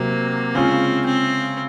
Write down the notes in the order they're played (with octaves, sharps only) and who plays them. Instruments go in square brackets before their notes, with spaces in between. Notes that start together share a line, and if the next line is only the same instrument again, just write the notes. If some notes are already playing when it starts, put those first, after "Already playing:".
Already playing: [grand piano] C3 F#3 C4 [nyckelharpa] A#3
[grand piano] C#3 G#3 C#4 F4 [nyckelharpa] C4
[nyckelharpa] C4